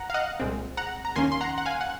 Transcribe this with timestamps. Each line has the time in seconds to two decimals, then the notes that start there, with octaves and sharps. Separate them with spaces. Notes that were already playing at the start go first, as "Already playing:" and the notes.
Already playing: F#5 A#5
0.10 F5
0.14 D#5 F#5
0.40 C2 A#2 G#3 C4
0.77 F#5 A#5
1.05 A#5
1.16 D#2 D#3 A#3 C#4 G#5 C6
1.32 C6
1.41 F#5 A#5
1.58 F#5
1.66 F5 G#5
1.81 F#5